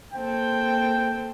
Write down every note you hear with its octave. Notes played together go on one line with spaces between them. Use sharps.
A#3 C4 A4 G5